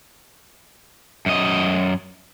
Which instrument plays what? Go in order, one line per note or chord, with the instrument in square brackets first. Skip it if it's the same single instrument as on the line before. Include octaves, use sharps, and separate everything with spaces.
[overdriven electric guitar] F#2 D#5